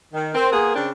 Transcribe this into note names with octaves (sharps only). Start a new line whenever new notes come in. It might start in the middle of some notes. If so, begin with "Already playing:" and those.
D#3
C4 A#4 C6
A#3 B3 G#4
C#3 C4 D4